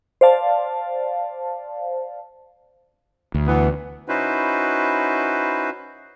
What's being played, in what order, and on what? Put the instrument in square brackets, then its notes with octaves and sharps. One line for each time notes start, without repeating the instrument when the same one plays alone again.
[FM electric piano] C5 D5 F5 A5
[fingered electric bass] D2
[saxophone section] E3 B3
[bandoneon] C#4 D#4 E4 F#4 B4 C5